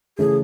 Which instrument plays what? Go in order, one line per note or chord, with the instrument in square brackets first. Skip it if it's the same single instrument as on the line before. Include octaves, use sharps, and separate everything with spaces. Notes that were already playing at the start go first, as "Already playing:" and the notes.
[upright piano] C#3 E3 A3 [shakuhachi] G#4